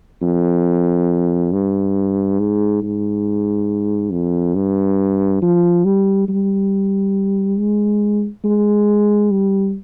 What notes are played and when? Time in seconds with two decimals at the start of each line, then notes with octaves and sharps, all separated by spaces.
0.22 F2
1.53 G2
2.39 G#2
2.83 G#2
4.12 F2
4.55 G2
5.42 F3
5.85 G3
6.28 G3
7.58 G#3
8.45 G#3
9.31 G3